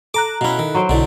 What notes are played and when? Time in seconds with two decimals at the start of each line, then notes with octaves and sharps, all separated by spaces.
0.14 A4 A#5 D6 F#6
0.41 B2 C#4 E4 F5
0.59 D#3
0.75 F#3 C5 G5
0.89 B1 B2 D3 E4